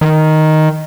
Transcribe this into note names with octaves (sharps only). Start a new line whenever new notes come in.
D#3